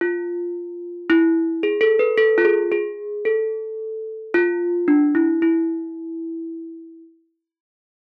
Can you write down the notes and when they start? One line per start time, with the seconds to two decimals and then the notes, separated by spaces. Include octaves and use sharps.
0.01 F4
1.10 E4
1.63 G#4
1.81 A4
1.99 B4
2.18 A4
2.38 F4
2.45 G#4
2.72 G#4
3.25 A4
4.34 F4
4.88 D4
5.15 E4
5.42 E4